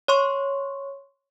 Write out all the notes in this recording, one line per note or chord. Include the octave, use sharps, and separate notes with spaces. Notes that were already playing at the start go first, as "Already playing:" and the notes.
C#5 C6 C#6